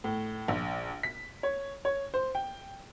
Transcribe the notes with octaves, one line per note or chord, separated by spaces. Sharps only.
A2
A#1
B6
C#5
C#5
C5
G5